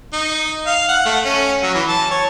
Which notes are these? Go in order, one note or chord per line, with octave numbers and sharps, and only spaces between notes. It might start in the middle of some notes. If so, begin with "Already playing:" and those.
D#4
F5
F#5
A3
C#4
F#3
E3
A5
C#5